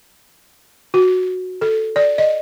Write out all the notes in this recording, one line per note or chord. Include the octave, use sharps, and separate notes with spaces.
F#4
A4
D5
D#5